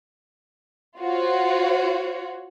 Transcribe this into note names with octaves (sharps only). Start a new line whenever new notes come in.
F4 F#4 C5 C#5